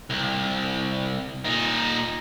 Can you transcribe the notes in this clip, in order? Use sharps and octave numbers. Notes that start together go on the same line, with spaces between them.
C2
A#2 D#4